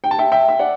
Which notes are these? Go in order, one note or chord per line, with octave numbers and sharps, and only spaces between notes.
G5
A5
E5 G5
E5 G5
E5
D5 F#5